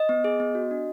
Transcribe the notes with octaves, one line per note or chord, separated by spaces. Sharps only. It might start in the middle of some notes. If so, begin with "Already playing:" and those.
Already playing: D#5
B3
G#4
B3
F#4
D4